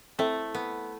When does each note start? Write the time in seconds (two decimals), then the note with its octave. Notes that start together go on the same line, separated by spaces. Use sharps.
0.19 A3 C4 E4 A4 E5
0.55 B3